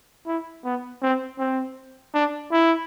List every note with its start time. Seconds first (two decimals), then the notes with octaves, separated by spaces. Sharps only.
0.27 E4
0.64 B3
1.02 C4
1.39 C4
2.14 D4
2.51 E4